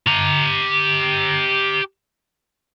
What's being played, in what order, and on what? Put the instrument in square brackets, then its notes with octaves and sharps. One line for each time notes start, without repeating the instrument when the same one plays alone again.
[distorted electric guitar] G4 A#5